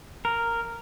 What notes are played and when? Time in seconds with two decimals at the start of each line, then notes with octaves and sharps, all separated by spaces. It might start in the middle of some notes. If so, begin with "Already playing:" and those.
0.25 A#4